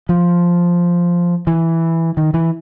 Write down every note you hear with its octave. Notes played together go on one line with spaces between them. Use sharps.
F3
E3
D#3
E3